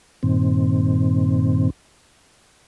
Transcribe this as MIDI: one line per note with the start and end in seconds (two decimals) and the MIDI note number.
0.23 1.70 43
0.23 1.70 46
0.23 1.70 51
0.23 1.70 60